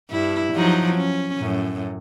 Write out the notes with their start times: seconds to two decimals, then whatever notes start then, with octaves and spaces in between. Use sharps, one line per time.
0.11 G2 E4
0.54 F3 F#3 D#4
0.95 C#4
1.39 F#2 A2